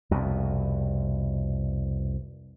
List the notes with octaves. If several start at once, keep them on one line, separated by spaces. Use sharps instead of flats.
C2 F2 B2